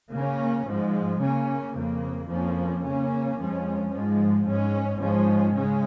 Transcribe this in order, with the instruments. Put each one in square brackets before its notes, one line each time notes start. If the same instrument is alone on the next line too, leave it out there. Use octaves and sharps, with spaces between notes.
[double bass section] C#3 A#3 C#4
G#2 F3 G#3
C#3 A#3 C#4
F2 C#3 A#3
F2 F3 A#3 C#4
C#3 A#3 C#4
F2 F3 G#3 C#4
G#2 F3 G#3
G#2 G#3 C#4
G#2 F3 G#3 C#4
C#3 G#3 C#4